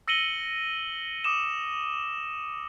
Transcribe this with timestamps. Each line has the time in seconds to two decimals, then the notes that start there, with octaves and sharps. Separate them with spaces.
0.08 E6 A#6 C#7 D#7 F#7 G7
1.24 D6 D#6 E7